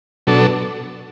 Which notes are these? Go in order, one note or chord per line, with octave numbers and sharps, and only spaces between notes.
B2 F#3 D4 A4